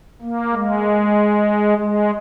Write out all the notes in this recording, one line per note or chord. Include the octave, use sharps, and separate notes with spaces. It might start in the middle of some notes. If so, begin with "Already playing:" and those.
A#3
G#3
G#3